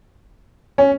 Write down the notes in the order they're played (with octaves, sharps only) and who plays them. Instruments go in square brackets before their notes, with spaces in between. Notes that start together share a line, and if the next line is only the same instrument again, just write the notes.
[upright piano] C#4